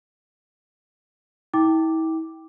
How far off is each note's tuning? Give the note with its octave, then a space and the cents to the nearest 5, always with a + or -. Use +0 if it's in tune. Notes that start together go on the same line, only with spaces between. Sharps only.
E4 -40 G5 +0 D6 +0